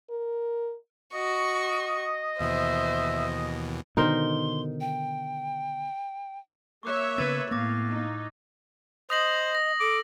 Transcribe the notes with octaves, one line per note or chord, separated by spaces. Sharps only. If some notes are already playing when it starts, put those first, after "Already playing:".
A#4
F#4 D#5 C#6
D#2 B2 E3 C5 E5
B2 D3 D#3 D#4 A#4 C5 C6
G5
A#3 C#5 E5 C#6 D6 F#6
C#3 B3 B4 E6 G#6 A6
A2 A#3 B3 F5 D6 A6 A#6
D#4
C5 D#5 D#6 A#6 F#7
A#6
A4 D6